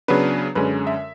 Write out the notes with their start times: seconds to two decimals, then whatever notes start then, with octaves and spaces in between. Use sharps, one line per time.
0.08 C#3 F#3 B3 D4 B4
0.55 F#2 D3 G#3 C#4 B4
0.87 E5